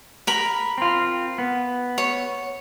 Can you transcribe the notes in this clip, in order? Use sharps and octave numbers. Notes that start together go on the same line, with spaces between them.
A#4 B5
C4 F4
B3
C#5